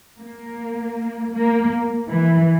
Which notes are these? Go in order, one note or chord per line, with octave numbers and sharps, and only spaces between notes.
A#3
A#3
E3